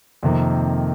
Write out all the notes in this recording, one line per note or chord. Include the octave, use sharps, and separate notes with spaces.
F2 C3 D#3 A#3